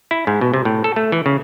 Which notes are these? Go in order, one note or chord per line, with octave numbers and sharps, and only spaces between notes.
E4
G#2
B2
C3
A2
A4
A3
E3
C#3